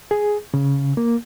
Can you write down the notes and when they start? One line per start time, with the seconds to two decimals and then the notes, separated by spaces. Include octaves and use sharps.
0.11 G#4
0.54 C#3
0.97 A#3